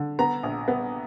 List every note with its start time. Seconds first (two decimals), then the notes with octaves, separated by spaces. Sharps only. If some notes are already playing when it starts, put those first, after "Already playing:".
Already playing: D3
0.19 B3 A#5
0.43 A#1
0.68 B3